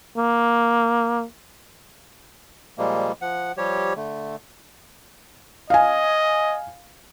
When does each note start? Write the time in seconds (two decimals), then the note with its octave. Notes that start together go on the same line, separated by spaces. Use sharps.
0.17 A#3
2.78 A#2 F3 G3 G#3 A#3
3.21 F3 F#5
3.58 F3 G3 G4 C#5
3.96 D3 A3
5.70 D#5 F5 G#5